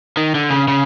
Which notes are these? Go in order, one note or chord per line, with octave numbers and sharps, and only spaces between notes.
D#3
D3
C#3
C#3